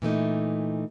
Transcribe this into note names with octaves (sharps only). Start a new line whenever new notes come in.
A#2 E3 A3 D#4